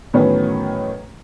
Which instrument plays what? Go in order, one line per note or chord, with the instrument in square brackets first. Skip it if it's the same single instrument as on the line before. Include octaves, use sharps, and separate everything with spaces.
[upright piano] A2 D#3 E3 F#3 B3 C#4